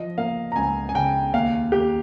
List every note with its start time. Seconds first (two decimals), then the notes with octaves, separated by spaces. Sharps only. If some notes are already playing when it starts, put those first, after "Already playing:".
Already playing: F3 D#5
0.18 A#3 F5
0.52 A#5
0.56 C#2 G#5
0.89 G#5
0.95 C#3 G5
1.33 D#2 F5
1.72 D#2 G4